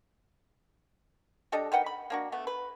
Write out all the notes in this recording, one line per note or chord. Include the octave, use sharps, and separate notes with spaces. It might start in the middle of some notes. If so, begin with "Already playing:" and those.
G3 D4 A4 D#5
D#3 B4 F#5 G5
B5
A#3 D4 F#4
A3 B3
B4